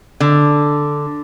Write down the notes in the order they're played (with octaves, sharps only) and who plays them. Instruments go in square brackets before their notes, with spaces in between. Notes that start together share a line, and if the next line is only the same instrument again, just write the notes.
[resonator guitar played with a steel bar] D3